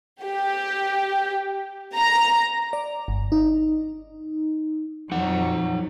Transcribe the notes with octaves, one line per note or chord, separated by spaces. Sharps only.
G4
A#5
D5
G1
D#4
F2 F#3 D#4 F#5